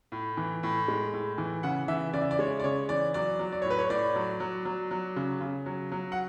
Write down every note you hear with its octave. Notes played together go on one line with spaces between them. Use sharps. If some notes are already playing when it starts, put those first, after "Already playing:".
A2
E3
A2
G#3
A2
E3
C#3 F#5
E3 E5
C#3 D5
E5
D5
G#3 C#5
D5
C#3 C#5
E3 D5
F#3 D5
F#3
D5
A2 C#5
B4
C#5
A2 D5
F#3
F#3
F#3
F#3
C#3
C#3
F#3
F#3
F#5